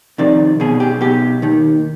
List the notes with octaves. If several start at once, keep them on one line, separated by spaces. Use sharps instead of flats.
F2 C3 D#3 D5
B1 B2 G#4
G4
B1 B2 G4
D#2 D#3